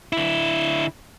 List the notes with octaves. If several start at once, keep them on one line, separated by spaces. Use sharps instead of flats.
D3 E4